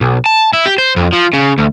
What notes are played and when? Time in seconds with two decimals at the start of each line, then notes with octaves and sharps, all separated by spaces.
0.01 B1
0.26 A5
0.53 E4
0.66 G4
0.78 C5
0.97 F2
1.13 F3
1.34 C#3
1.58 D2